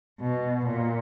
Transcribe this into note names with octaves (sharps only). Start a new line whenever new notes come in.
B2
A#2